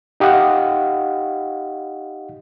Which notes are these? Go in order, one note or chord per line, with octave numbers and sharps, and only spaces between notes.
D#4 G4 D#5 F5 F#5